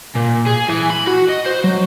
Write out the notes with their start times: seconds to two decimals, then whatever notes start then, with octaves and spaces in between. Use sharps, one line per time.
0.16 A#2
0.47 G#4
0.69 E3
0.91 B5
1.08 F#4
1.29 D#5
1.46 C5
1.64 F#3